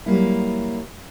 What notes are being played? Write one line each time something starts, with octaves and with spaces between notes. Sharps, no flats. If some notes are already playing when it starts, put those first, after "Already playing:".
F#3 G3 A#3 E4